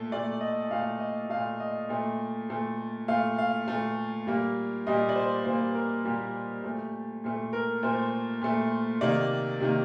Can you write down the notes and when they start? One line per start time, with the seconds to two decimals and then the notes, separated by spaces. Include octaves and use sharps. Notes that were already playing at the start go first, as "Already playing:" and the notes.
Already playing: A#2 A3 A4
0.11 A#2 A3 D5
0.41 D#5
0.70 A#2 A3 F5
1.00 D#5
1.30 A#2 A3 F5
1.60 D#5
1.89 A#2 A3
2.50 A#2 A3
3.08 A#2 A3 F5
3.38 F5
3.68 A#2 A3
4.27 A#2 G3 A#3
4.87 A#2 G3 A#3 D#5
5.09 D5
5.15 C5
5.45 A#2 G3 A#3 C5
5.75 A#4
6.05 A#2 G3 A#3 G4
6.64 A#2 A3
7.24 A#2 A3
7.53 A#4
7.83 A#2 A3 C5
8.42 A#2 A3
9.01 C3 D#3 A#3 D5
9.61 C3 D#3 A#3